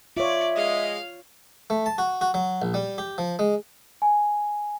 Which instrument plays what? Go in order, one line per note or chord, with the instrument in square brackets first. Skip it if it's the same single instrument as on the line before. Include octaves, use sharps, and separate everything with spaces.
[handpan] F4 C#5 [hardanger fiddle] D5 [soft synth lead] E5
[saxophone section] G#3 D#5 [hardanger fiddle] F5
[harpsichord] A3
A5
F#4
F#4
F#3
A#1
G3
G4
F3
G#3
[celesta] G#5